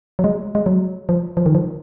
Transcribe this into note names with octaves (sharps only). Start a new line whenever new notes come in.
F#3
G#3
G#3
F#3
F3
F3
D#3
F3